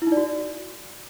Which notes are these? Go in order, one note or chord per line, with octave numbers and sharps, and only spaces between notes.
E4
D#4
D5
F#4